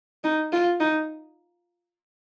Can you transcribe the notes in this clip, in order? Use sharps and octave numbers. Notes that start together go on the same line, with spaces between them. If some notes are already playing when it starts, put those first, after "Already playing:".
D#4
F4
D#4